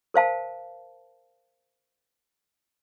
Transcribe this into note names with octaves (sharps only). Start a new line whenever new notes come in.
A#4 C5 F5 A5